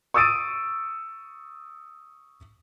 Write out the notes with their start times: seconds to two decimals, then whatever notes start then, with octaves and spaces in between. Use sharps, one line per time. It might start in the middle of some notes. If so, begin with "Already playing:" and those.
0.14 C#6 D#6 E6 A6 D7 D#7